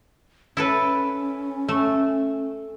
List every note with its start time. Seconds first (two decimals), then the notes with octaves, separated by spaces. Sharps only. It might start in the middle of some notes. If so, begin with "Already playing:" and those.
0.57 C#4 E4 A4 B4
1.69 A3